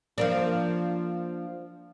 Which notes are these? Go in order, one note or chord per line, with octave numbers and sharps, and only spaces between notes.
F3 A#3 D4